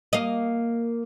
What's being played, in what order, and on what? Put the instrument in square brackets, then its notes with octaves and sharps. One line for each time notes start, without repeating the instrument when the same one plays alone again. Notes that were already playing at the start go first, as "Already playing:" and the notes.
[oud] A#3 D#5